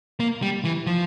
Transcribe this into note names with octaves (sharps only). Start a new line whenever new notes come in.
A#3
G3
E3
F3